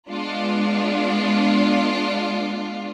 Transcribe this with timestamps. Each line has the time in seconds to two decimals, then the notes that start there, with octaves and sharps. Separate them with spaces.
0.11 G#3 B3 D4 F4